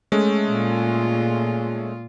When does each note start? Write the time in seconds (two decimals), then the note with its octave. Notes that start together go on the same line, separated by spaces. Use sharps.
0.12 G#3 A3 C#4
0.48 A#2 F4